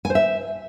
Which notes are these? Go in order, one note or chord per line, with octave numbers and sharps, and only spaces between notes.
G#5
C5
E5